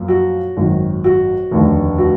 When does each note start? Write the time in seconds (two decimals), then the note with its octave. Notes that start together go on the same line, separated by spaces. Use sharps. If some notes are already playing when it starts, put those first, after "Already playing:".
Already playing: F#2 F3 A#3
0.08 F#4
0.57 G#1 F#2 D#3
1.04 F#4
1.51 F1 D#2 D3
1.98 F#4